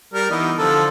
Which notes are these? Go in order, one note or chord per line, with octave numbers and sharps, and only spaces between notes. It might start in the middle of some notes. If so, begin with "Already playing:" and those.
G3 A#4
E3 B3 D#4
D3 F3 A4